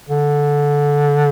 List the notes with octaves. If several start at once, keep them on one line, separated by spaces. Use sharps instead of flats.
D3